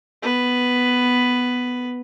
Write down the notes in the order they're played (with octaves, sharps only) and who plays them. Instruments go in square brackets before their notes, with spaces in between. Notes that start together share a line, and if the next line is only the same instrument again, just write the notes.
[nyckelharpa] B3 B4